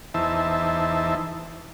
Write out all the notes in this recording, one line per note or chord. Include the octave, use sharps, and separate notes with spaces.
E2 E3 D#4 C5 E5 A5